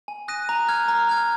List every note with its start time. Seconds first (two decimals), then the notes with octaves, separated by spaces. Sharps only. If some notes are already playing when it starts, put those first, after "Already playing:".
0.08 G#5
0.28 D#6 F#6 A#6 D#7
0.49 A#5
0.68 F6 G#6
0.88 A#5
1.09 F6 G#6